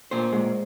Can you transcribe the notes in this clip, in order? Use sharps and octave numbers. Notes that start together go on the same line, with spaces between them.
A#2 C5
G#3